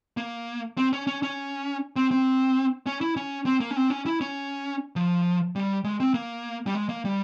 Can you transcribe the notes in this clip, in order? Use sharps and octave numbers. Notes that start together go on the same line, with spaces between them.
A#3
C4
C#4
C#4
C#4
C4
C4
C#4
E4
C#4
C4
A#3
C#4
C4
C#4
E4
C#4
F3
G3
G#3
C4
A#3
G3
G#3
A#3
G3